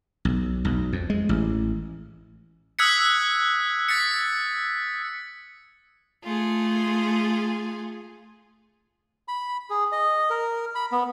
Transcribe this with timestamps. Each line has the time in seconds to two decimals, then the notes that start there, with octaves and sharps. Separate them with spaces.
0.25 B1
0.65 B1
0.93 F2
1.10 G#3
1.29 A1
2.79 D#6 E6 F#6 G#6 B6 C#7
3.89 A6 B6 C#7
6.23 A3 F4 G#4
9.28 B5
9.70 G#4
9.92 D#5
10.30 A#4
10.75 B5
10.92 B3